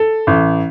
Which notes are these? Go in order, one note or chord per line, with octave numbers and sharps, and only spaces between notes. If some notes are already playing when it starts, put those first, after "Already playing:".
Already playing: A4
A1